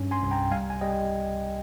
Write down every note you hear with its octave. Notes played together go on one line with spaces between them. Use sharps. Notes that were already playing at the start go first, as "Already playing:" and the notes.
Already playing: G2 C#4
G#5 C6
C2
G5 A#5
G3 F5 G#5
G#5
G3 D#5 G5